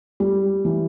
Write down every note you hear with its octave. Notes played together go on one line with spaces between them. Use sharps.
G3
E3